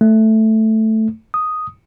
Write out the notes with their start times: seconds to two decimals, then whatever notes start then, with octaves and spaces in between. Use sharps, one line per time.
0.01 A3
1.34 D#6